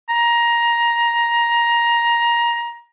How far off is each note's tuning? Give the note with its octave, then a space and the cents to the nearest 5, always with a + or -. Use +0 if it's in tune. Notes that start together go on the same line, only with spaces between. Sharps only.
A#5 +15